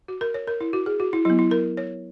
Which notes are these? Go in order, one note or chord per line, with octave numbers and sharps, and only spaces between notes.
F#4
A#4
C#5
A#4
E4
F#4
G#4
F#4
E4
F#3 B3 E4
E4
A#4
C#5